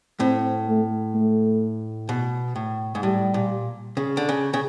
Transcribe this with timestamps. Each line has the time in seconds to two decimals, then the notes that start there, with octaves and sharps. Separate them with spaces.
0.20 A2 C4
0.67 A3
1.14 A3
2.09 B2
2.56 A2
2.95 G#2
3.03 A2 G3
3.34 A#2
3.97 C#3
4.17 D3
4.29 C#3
4.54 C#3